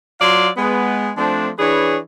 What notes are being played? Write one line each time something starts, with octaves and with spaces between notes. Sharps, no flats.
F#3 F4 D5 F5 C6
G#3 B3
F3 A3 C4 D4
E3 D4 G#4 B4 C#5